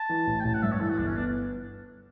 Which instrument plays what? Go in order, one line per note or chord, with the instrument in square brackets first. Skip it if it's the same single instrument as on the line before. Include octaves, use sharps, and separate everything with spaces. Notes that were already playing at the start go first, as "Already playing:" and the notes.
Already playing: [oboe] A5
[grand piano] E3
A1
[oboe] G5
[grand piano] A1 [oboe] A5
[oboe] F#5
[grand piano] G2 [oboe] E5
[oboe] C#5
[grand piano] E3 [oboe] A4
[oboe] F#4
[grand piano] G1 [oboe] D4
[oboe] C#4
[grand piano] B3 [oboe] D4